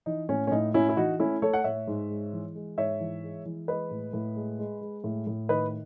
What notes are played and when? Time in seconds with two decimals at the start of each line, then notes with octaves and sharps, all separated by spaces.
0.06 E3 D#4
0.29 A2 C#4
0.47 C#4
0.51 A2 D#4
0.74 A2 C#4 E4
0.89 E4
0.97 E3 D#4 F#4
1.19 A3 C#4 E4
1.42 A3 A4 C#5
1.53 F#5
1.64 A2 C#5 E5
1.87 G#2
2.10 G#3
2.33 E3
2.55 G#3
2.78 G#2 C#5 E5
3.00 E3
3.23 G#3
3.46 E3
3.68 G#3 B4 D#5
3.91 A2
4.13 A2
4.36 G#3
4.59 G#3
4.81 G#3
5.04 A2
5.27 A2
5.49 D#3 B4 D#5